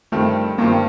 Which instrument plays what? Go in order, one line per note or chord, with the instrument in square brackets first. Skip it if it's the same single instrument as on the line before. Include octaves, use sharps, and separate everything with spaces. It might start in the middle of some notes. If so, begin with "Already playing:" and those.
[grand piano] G2 D#3 G3 C4 F4 [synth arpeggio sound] A3
[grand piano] G2 D#3 G3 C4 F4 [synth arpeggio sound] A#3